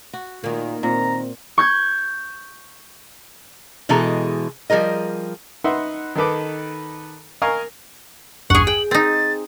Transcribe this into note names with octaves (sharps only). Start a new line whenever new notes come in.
F#4
A#2 D#3 A#3
A#2 C4 A#5
C#6 G6 G#6
B2 E3 G#3 G#4 A4 A#5
F3 G3 G#4 A#4 D#5
D#4 B4 E5 F#5 C6
D#3 D#4 A4 B4 D6
A#4 D#5 F5 G#5 A#5 C#6
A1 E2 G2 G#4 F#5 C#6
G#4 G5 F#7
C4 D#4 A6